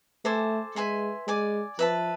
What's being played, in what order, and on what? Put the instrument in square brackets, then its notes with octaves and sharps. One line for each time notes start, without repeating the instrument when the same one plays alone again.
[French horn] A3 [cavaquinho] A4 C5 G#5 D6
[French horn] G#3 [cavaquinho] B4 E5 G#5 C6
[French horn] G#3 [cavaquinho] D5 G#5 D6
[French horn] F3 [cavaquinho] B4 E5 A5